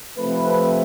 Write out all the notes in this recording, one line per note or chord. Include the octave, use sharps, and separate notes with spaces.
C3 F3 A3 C4 B4